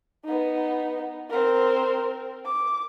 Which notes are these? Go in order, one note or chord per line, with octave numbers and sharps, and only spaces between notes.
B3 D#4
C4 A#4
D6